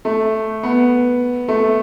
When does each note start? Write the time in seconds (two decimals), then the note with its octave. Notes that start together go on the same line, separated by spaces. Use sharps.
0.05 A3
0.63 B3
1.48 A3